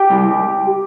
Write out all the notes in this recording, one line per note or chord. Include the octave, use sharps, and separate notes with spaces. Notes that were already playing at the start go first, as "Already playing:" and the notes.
Already playing: G4 G5
C3 G3
C#2